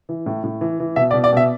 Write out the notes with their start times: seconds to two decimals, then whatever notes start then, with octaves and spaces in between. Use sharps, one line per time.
0.09 E3
0.26 A2
0.44 A2
0.61 E3
0.80 E3
0.96 B2 E5
1.11 D5
1.14 B2
1.24 D5
1.32 B2 E5